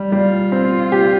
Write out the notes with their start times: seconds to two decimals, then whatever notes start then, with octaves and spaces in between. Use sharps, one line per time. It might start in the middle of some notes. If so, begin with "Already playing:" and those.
Already playing: G3
0.12 G3 F4
0.52 C4
0.92 G4